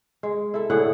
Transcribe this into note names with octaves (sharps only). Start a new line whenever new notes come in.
G#3
E4 A4
A2 D3 G#4 F#5